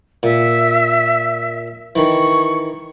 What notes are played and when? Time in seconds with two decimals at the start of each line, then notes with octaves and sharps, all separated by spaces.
0.23 A#2 E5
1.96 D#3 E3 C#6